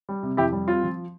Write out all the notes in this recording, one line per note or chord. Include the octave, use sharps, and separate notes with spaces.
G3
C3
F2 E4 G4
G3
C4 F4
F3